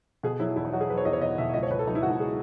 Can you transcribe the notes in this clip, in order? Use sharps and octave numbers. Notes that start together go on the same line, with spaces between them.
B2 G#4
F#3 E4
E2 E4
D#4
F#3 F#4
G#4
F#3 B4
C#5
E2 D#5
C#5
B2 D#5
B2 E5
C#2 D#5
C#5
C#2 B4
A4
F#3 D#4
E4
C#2 F#4
E4
G#4